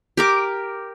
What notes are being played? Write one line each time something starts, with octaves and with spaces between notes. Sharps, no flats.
G4 A#4 D6